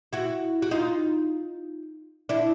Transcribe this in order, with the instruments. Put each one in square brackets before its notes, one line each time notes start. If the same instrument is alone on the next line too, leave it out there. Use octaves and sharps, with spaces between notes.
[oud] E4 F#4
F#4
D#4 F4
D4 E4